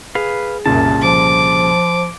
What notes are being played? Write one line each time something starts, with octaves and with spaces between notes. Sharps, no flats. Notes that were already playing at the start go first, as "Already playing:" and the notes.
G#4 B4 F5
C2 F#2 A#2 C#3 A5
F3 D6